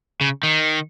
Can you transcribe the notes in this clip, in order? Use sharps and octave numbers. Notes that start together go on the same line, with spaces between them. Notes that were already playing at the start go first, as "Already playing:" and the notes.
C#3
D#3